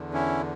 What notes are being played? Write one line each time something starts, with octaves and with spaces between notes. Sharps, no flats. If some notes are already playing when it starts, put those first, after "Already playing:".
Already playing: E2 D3
C#4 E4